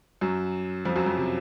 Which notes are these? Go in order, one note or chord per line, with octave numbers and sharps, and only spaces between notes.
F#2 F#3
F2 F3
F#2 F#3
F2 F3
C3